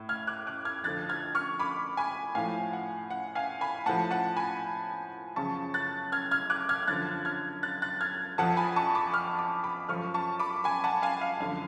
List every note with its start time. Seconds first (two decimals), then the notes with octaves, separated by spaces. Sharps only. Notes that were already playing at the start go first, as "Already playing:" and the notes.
Already playing: A2
0.09 F6 G#6
0.27 D6 F#6
0.47 D6 F#6
0.65 F6 G#6
0.84 F2 D3 F3 F#6 A6
1.09 F6 G#6
1.35 C#6 F6
1.59 B5 D6
1.97 G#5 B5
2.35 A2 F3 F5 G#5
2.73 F#5
3.10 F#5
3.35 F5 G#5
3.61 G#5 B5
3.86 A2 F3 F#5 A5
4.11 F#5 A5
4.37 G#5 B5
5.36 F#2 C#3 F3 A5 C#6
5.74 F#6 A6
6.12 F6 G#6
6.31 F6 G#6
6.50 D6 F#6
6.69 F6 G#6
6.87 F#2 D3 F3 F#6 A6
7.25 F6 G#6
7.63 F#6 A6
7.82 F#6 A6
8.00 F6 G#6
8.38 F2 F3 F#5 A5
8.57 G#5 B5
8.76 A5 C#6
8.95 B5 D6
9.13 C#6 F6
9.39 B5 D6
9.64 B5 D6
9.89 F#2 F3 C#6 F6
10.14 A5 C#6
10.39 B5 D6
10.64 G#5 B5
10.84 F#5 A5
11.02 F5 G#5
11.21 F5
11.40 F#2 D3 F3 F5